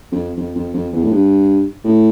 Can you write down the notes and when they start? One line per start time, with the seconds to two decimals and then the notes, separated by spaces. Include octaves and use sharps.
0.12 F2
0.37 F2
0.55 F2
0.74 F2
0.92 E2
1.04 A2
1.11 G2
1.84 A2